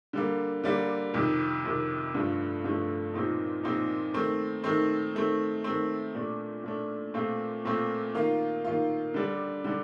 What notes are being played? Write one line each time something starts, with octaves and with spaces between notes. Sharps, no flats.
D3 G3 A#3
D3 G3 A#3
F2 C3 D#3
F2 C3 D#3
G2 D3 F3 A3
G2 D3 F3 A3
A#2 F3 C4 D#4
A#2 F3 C4 D#4
D#3 A3 C4
D#3 A3 C4
D#3 A3 C4
D#3 A3 C4
A#2 A3 D4
A#2 A3 D4
A#2 A3 C4 F4
A#2 A3 C4 F4
D#3 A#3 F4
D#3 A#3 F4
D3 G3 D4
D3 G3 D4